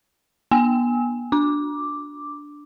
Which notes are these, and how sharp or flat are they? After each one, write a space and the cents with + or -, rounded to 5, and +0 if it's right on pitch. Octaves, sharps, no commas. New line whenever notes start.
B3 -35 G#5 +0 E6 -30
D4 +0 D6 +0